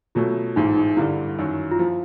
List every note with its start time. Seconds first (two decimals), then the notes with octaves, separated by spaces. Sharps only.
0.15 B2 F#3 A3 C#4 F4
0.56 A1 G#2 E3 D#4
0.77 D#4
0.97 G2 D3 G3 E4
1.38 F#2 D#3 F#3
1.71 F4
1.79 F3 E4